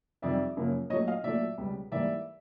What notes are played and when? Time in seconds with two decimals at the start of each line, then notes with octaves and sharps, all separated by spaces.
0.22 F2 C3 D#3 G3 D5 E5
0.57 F#2 C#3 F3 A#3
0.90 A#2 F#3 A3 C#5 D#5
1.08 D#5 F5
1.24 A#2 F#3 A3 D5 E5
1.58 C#2 B2 G3 B3
1.92 G#2 E3 G3 A#3 D5 E5